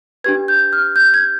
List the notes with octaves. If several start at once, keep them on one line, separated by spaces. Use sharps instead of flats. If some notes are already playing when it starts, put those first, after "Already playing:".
D4 G4 B4 G#6
G6
F6
G6
G#6